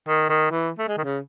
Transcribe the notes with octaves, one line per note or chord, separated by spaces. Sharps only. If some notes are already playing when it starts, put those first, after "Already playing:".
D#3
D#3
E3
A3
G#3
D#3
C#3